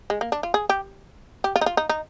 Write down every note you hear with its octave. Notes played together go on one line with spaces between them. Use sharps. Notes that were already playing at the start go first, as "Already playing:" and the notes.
G#3
A#3
D4
F4
G#4
G4
G4
F4
D#4
F4
D#4
D#4